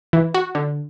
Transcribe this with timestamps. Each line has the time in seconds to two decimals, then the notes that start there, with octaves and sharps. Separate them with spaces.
0.13 E3
0.34 F#4
0.55 D3